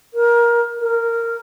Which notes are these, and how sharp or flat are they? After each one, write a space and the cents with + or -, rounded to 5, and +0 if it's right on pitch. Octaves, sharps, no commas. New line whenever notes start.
A#4 +20
A#4 -10